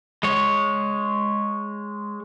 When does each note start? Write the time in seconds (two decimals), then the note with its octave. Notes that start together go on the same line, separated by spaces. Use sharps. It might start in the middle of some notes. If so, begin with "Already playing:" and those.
0.23 G#3 C#5